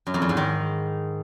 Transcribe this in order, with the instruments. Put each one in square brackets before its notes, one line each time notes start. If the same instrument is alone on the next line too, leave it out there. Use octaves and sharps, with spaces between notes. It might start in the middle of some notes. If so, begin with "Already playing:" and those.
[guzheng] F#2
F2
E2
G#2
D#3